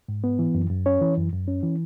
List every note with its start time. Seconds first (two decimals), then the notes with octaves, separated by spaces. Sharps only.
0.08 G#2
0.24 B3
0.39 E3
0.55 F#2
0.70 F#2
0.86 C#4 C#5
1.01 E3
1.17 F#2
1.32 F#2
1.48 C#4
1.63 E3